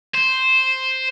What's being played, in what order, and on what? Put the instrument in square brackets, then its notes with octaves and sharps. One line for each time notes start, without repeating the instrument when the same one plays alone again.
[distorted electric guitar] C5